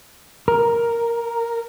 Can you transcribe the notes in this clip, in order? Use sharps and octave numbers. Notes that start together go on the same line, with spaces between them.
A#4